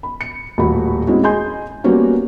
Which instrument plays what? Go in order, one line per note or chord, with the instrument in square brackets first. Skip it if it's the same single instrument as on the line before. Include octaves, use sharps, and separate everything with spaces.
[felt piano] B5
C#7
D#1 A2 F#4 B5
G#3 C4 C#4 E4 F#4
G#4 D#5 G#5 C6 G6
F#3 G3 A#3 B3 C#4 F#4